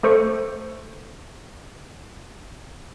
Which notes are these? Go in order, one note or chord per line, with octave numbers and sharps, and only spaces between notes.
A3 A4 C5 C#6 C#7